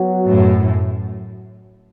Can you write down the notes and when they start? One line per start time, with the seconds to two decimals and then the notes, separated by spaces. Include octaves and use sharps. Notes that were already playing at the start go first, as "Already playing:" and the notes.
Already playing: F#3 B3 F#4
0.28 F#2 A2